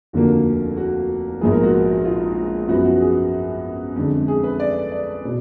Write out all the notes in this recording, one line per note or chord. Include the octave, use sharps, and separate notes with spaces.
F1 D#2 D3 F3 A#3 F#4
F#4
A#1 G#2 F3 B3 G#4
A#4
F#4
F4
F#2 F3 B3 F#4
F#4
G#4
F2 D3 G#3
G#4
B4
D5
D5
B2